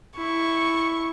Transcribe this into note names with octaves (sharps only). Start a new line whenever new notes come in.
E4 C#6